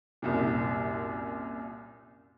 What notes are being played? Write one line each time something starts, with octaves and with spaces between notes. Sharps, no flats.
C2 F#2 A#2